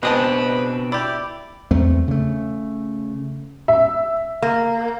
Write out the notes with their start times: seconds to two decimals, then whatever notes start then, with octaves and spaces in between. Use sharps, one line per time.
0.03 B2 G#3 C4 D4 B4 D#5 A5
0.92 E4 G4 D5
1.71 E2 A3 C4
2.08 C#3 A3
3.68 E5
4.42 A#3